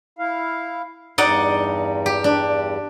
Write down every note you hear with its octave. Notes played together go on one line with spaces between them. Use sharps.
E4 F5
E2 G2 D#4 D5 F#5
G4
D4